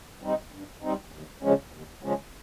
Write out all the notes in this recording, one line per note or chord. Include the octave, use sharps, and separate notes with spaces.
G3 C4 D#4
G2
G3 C4 D#4
D#2
C#3 F3 G#3 C#4
D#2
C#3 F3 G#3 C#4